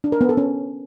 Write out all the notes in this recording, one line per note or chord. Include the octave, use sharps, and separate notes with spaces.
D4
A#4
B3
A4
C#4